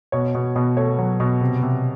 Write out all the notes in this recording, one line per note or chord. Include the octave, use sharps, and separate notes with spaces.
B2 C#5
B2
B2
A3 C#5
F#3
B2
C3
C3